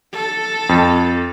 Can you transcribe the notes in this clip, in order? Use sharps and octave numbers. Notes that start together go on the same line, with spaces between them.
A4
F2